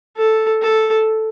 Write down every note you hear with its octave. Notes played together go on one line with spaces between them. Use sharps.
A4
A4